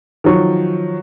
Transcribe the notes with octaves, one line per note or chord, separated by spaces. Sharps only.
D#3 F3 F#3 C#6